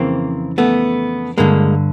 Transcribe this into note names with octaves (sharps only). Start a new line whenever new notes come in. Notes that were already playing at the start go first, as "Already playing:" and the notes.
Already playing: F2 C#3 E3 A#3 C4
A3 B3
G2 D3 G#3 A#3